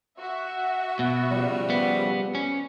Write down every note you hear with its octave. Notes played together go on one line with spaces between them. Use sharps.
F#4 E5
B2
C#3 F3 G3
B3
C#4